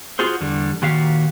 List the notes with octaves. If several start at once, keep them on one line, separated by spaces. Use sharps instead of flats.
F4 F#4 G#4 C5
E2 D3 G3
A#2 D#3 F#4 G4 F5